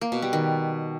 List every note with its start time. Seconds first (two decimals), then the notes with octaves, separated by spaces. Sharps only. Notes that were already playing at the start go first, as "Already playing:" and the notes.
0.01 A#3
0.12 B2
0.22 G3
0.33 D#3